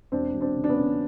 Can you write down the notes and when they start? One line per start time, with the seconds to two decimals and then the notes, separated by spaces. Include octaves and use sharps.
0.12 E1 C4 D4
0.34 E1
0.41 C4 D4
0.55 C#3
0.64 D4
0.69 B3 C#4
0.77 C#3